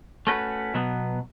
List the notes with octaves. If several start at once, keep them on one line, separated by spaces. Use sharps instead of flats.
A3 C#4 F#4 B4
B2 F#3 B3